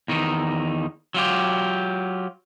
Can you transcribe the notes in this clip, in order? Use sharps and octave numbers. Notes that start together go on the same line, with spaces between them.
E2 D#3 D#4
F#3 F4 G4